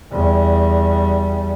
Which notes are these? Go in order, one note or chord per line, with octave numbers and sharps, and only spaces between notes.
E2 G3